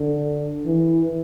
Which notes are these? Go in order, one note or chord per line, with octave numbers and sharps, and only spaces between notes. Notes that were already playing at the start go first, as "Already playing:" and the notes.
Already playing: D3
E3